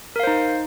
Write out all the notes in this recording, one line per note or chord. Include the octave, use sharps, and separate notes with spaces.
D#4 A#4 C5 F5